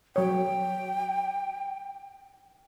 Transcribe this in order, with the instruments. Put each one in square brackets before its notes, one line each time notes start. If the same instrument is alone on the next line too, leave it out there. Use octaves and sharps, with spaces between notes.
[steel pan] F#3 C#5 [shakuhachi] G5